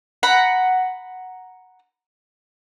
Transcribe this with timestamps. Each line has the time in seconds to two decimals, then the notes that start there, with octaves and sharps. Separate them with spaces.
0.23 F#5 A#5 B5